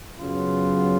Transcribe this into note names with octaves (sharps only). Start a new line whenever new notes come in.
F#2 C#3 F#3 B3 F4